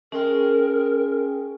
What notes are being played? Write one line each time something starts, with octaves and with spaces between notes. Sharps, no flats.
G#3 C#4 A#4 G5